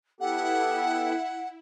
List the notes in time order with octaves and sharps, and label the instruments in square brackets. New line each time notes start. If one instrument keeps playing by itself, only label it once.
[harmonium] B3 G4 A4 [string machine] E4 [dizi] F#5